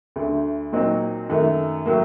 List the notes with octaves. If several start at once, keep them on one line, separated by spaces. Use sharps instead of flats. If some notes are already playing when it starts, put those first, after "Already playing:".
D2 D3 A3
A#2 F#3 C4 D#4
F#2 D#3 A3
A2 F#3 A#3